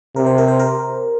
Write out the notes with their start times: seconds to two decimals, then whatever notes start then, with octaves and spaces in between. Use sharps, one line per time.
0.16 C3 A#4
0.26 C5
0.38 A#4
0.48 C5
0.60 A#4